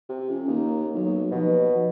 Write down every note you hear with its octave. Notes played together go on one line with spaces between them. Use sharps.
C3
F2 C#4
D#2 A#3
B1 F#3
D#2 B2 F3